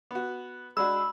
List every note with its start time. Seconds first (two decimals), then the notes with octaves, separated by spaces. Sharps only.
0.11 B3 F#4
0.77 G#3 D4 F#4 B5 E6